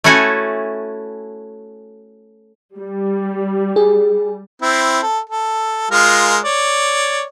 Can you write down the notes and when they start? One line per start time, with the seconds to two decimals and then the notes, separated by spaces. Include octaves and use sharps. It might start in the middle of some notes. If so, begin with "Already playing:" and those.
0.04 A3 C#4 E4 F#4 A4 G#5
2.77 G3
3.76 G#4
4.62 C4 E4
5.03 A4
5.30 A4
5.91 G#3 F4 A#4
6.44 C#5 D5